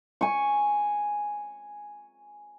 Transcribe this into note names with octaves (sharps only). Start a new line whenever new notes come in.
G#5 C#6